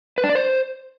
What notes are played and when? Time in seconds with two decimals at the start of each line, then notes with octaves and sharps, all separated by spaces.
0.18 B4
0.24 D4
0.29 D5
0.35 C5